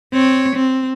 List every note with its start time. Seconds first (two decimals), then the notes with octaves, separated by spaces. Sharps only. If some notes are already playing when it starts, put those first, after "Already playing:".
0.13 C4 C#5
0.56 C4